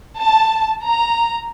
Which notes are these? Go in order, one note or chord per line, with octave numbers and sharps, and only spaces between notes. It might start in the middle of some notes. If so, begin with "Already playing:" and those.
A5
A#5